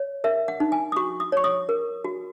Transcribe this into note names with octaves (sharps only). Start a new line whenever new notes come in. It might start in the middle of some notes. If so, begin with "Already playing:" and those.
Already playing: C#5
A#4 E5
F#5
D#4
G#5
D#6
F#4 C#6
D#6
C#5 C#6
D#6
A#4
F#4